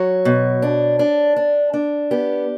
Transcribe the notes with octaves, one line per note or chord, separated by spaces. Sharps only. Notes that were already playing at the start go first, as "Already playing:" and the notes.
Already playing: F#3 C#5
B2
D4
D4
D4
D4
B3 G4